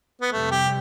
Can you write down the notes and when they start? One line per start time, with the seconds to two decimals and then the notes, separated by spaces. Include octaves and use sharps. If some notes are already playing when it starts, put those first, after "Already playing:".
0.21 B3
0.32 F2 C3 G3 A3
0.51 G4